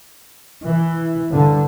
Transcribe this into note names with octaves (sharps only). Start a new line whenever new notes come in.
E3
G2 D3